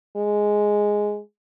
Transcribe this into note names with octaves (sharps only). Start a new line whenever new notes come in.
G#3